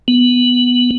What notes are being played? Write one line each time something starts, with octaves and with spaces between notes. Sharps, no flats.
B3